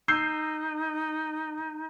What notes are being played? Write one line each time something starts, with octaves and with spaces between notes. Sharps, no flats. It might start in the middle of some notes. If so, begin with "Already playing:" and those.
D#4 E6 G6 C7